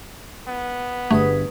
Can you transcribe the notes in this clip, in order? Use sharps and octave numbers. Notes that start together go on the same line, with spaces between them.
B3
G1 G2 A3 G#4 B4 D#6